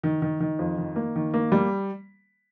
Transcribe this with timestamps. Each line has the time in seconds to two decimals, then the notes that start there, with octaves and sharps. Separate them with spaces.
0.03 D#3
0.22 D#3
0.40 D#3
0.59 F2
0.78 D#3
0.96 A#3
1.16 D#3
1.34 A#3
1.52 G3